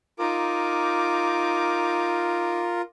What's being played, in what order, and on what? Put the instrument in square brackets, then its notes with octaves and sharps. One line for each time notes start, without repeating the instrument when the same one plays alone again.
[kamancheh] D#4 D6 [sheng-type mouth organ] F4 A#4